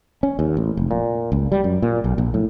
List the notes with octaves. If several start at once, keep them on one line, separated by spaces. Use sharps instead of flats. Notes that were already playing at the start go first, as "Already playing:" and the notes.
C#4
D#2
A1
F1
A#2
C#2
G3
F#2
A#2
B1
A#1
A2